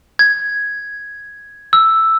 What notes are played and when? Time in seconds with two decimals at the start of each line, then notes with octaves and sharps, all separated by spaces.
0.19 G#6
1.73 E6